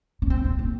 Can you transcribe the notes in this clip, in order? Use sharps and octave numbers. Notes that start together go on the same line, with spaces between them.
C#4
C4
C4
A#3